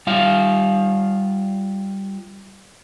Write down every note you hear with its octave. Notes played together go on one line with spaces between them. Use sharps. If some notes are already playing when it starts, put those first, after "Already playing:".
G3 F4 F5